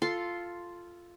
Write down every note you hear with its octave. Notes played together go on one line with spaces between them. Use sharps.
F4 A4 C6